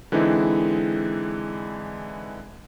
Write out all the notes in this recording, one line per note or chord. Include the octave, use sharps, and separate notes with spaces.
D3 E3 G#3 C4 D#4 E4